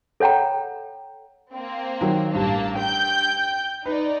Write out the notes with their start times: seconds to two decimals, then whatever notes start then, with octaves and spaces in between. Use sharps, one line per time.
0.20 A4 C#5 F#5 G5 A#5
1.53 A#3 C4
2.01 D#3 F#3
2.34 A1 G2 A#3 A5
2.77 G5 G6
3.86 D#4 B4 D5